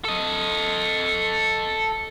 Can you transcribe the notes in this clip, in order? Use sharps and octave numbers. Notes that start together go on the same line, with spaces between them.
A4 D#5